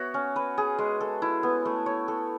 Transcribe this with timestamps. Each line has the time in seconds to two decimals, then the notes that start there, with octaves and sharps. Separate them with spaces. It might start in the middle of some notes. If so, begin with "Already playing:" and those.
Already playing: B3 F#4 C#5 E5
0.14 C#4
0.36 B4
0.58 G#4
0.79 G#3
1.00 A4
1.22 E4
1.43 B3
1.65 A3
1.86 C#5
2.08 A4